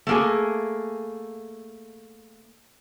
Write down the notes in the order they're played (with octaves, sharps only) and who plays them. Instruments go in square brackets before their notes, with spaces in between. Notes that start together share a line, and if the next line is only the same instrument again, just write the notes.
[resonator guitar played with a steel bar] A3 A#3 G#4